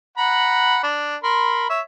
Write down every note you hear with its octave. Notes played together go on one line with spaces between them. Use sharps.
F#5 A#5 B5
D4
A#4 B5 C6
C#5 E5